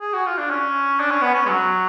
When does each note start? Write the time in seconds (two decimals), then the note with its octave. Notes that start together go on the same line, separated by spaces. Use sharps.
0.01 G#4
0.13 F#4
0.26 F4
0.38 D4
0.50 C#4
1.00 D4
1.11 C#4
1.22 B3
1.34 C#4
1.45 G#3
1.49 F#3